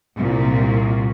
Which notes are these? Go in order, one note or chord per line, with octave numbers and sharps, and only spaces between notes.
C2 A#2